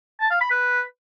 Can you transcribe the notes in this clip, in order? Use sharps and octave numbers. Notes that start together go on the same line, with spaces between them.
A5
F5
B5
B4